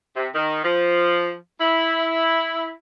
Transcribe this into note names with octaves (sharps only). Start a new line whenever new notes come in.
C3
D#3
F3
E4